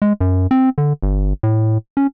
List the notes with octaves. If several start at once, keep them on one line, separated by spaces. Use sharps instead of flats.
G#3
F#2
C4
D3
G1
A2
C#4